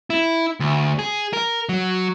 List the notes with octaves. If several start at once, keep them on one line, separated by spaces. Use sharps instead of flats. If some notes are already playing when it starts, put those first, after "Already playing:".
E4
D2
G#4
A#4
F#3